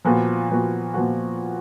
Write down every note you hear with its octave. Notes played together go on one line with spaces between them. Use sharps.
A#2 F3 B3 F#4
A#2 F3 B3 F#4
A#2 F3 B3 F#4